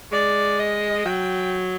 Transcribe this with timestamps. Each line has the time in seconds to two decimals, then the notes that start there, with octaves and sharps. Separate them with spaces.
0.12 G#3 D5
0.59 D#5
1.05 F#3 G5